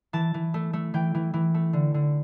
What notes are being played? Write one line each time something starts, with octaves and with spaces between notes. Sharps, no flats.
E3 A5
E3
A3
A3
E3 G5
E3
E3
A3
D3
D3